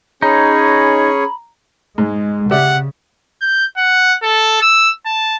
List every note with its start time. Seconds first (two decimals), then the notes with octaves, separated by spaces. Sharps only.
0.22 C#4 D#4 G#4 C#5 A#5 B5
1.98 G#2 G#3
2.51 C#3 G4 D5 E5 F#5
3.41 G6
3.77 F#5
4.23 A4
4.62 E6
5.06 A5